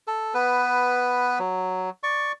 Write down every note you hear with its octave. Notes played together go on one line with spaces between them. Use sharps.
A4
B3 B4
F#3
D5 C#6